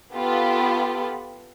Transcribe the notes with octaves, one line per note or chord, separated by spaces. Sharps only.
B3 F4 G4 A4 B5